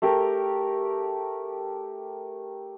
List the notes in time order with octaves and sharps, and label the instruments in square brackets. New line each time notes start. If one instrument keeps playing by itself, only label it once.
[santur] A3 G4 A#4